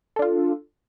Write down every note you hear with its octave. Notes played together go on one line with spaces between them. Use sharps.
D4 F4 A4